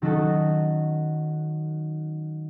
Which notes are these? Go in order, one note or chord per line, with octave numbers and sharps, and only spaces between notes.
D#3 F#3 C#4 D#4 F#4 A4